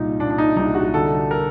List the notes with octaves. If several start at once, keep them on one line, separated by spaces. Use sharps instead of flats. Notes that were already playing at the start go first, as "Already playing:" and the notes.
Already playing: C2 A#2 D#4
A#2 D4
D4
D#4
C2 D#4
F#4
D3 A4
A#4